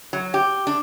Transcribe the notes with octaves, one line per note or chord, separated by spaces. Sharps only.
F#3
G4
D4